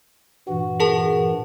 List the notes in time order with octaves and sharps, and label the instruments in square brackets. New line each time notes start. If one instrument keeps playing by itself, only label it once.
[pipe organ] G2 A#2 E3 [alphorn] F#4
[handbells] G#4 A#4 A5